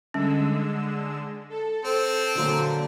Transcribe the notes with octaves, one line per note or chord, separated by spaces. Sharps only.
D3 G3 G#3 C#4 E6
A4
C4 C5
A#2 D3 F#3 A#3